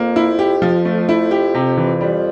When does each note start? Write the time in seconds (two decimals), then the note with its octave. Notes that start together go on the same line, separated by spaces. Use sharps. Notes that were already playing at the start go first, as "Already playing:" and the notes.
Already playing: F2 A#3
0.16 E4
0.39 G4
0.62 F3
0.85 A3
1.09 E4
1.31 G4
1.54 C3
1.77 E3
2.01 G3